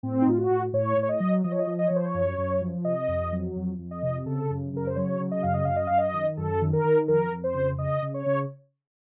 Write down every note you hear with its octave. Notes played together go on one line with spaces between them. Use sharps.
A2 C4
D#4
A2 F4
F#4
A2
A2 C#5
A2
C#5
D#5
F#3
F3 D#5
C#5
D#5
F3
D#5
F3 C#5
C5
C#5
F#2
F#2
F3
C3 D#5
F2
F#3
F2
F2
D#5
C3
C#3 A4
F#2
C#3 A#4
C5
F#3 C#5
C#3
D#5
F#2 F5
D#5
F#2 F5
D#5
F#2 F5
D#5
D#3
F#2 A4
D#3
A#4
D#3
F2 A#4
F2
C5
C#3
C#3 D#5
C#3
C#5
C#3